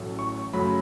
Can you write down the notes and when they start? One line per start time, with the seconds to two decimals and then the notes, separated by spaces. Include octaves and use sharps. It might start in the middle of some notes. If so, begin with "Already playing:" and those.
Already playing: A1 A2 F#3 A3
0.19 C#6
0.53 F#2 C#3 F#3 A3 B5